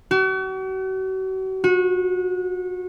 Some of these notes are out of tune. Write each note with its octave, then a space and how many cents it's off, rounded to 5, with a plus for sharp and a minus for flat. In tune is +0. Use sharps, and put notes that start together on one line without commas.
F#4 +40
F#4 -30